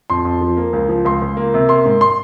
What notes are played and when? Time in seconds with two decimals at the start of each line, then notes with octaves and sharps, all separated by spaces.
0.10 F2 C6
0.25 F2
0.41 F3
0.57 A#3
0.73 C#2
0.89 F3
1.05 C#2 C6
1.22 C#2
1.37 A#3
1.54 C3
1.69 A#3 C6
1.85 G#2
2.01 C6